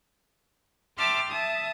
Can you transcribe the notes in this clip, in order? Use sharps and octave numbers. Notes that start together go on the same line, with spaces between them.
E5 G5 A5 C6 D6 F6
E5 A5 D#6